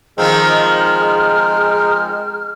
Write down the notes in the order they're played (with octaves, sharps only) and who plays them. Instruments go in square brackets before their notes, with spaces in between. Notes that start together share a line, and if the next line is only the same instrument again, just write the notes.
[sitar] D#3 F3 C4 [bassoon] G#3 [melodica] D#4 G5 [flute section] G#4 F6